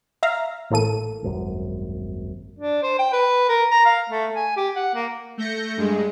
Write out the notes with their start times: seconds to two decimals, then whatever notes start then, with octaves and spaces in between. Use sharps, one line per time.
0.23 E5 F5 A#5
0.70 A1 A2 A#3 A4 D#7
1.22 D#1 G#1 F#2
2.59 D4
2.83 C5
2.99 G5
3.13 B4
3.49 A#4
3.71 A#5
3.85 F5
4.09 A3
4.36 G#5
4.57 G4
4.76 F#5
4.94 A#3
5.37 A3 G6 A#6 C#7
5.77 G2 G#3